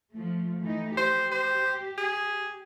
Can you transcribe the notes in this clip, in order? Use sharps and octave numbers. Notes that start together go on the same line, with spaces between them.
F3 A3
E3 A3 D#4
G4 C5
C5
G#4